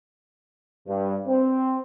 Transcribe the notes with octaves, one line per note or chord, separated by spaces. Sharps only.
G2
C4